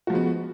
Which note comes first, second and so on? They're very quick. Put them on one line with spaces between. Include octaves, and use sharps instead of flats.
F#4 F3 G#3 B3